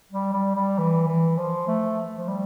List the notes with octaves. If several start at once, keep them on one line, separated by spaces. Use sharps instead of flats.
G3
G3
G3
E3
E3
F3
A3
F3
G3